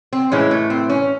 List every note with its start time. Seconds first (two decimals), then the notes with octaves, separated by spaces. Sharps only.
0.13 C4
0.32 A2 E3 G#3 C#4
0.51 A3
0.70 C4
0.90 C#4